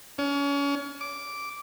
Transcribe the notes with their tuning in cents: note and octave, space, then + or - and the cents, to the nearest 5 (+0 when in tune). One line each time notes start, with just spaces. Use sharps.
C#4 +30
D6 -5